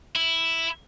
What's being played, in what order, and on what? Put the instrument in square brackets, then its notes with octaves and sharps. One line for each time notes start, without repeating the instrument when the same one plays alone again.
[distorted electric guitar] E4